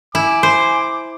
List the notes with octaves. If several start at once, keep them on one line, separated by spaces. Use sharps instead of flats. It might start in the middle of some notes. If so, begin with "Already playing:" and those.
E4 G#5 D6
C5